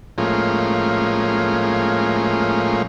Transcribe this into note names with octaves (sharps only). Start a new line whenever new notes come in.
A2 F3 G#3 A#3 C#4 F4